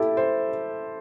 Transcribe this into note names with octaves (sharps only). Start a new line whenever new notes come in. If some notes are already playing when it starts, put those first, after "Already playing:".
Already playing: E4 G4 A4
C5